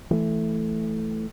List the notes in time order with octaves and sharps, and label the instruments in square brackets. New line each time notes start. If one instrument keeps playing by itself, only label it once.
[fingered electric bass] E3 A3